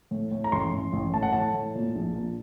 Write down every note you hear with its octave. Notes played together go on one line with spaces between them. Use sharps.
A2
A2
A#5
A1 C6
A1
A1
A2 A5
F#5
A2 A5
A2
A#2
A#1
A#2